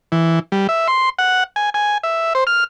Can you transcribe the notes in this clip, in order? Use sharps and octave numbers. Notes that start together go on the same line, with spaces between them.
E3
G3
E5
C6
F#5
G#5
G#5
E5
C5
F6